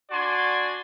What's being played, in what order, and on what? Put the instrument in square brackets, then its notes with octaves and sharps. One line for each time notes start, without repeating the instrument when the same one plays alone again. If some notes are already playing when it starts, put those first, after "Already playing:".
[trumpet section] D4 F#4 D5 G#5 C6